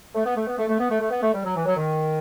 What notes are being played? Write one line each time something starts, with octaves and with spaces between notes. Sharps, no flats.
A3
B3
A3
B3
A3
A3
B3
A3
A3
B3
A3
G3
F#3
E3
F#3
D#3